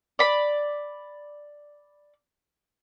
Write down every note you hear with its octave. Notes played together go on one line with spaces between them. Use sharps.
D5 B5